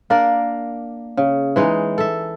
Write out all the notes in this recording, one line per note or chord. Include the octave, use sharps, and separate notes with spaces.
A#3 D4 A#4 D5
C#3
E3 G#3 D#4
A4 E5